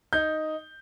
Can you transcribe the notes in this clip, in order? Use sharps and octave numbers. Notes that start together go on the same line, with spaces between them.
D#4 G6